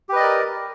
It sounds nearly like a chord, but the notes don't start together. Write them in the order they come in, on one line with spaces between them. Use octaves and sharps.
G4 B4 D#5 D5 A#4